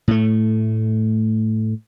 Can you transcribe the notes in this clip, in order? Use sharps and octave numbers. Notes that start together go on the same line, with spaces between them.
A2 A3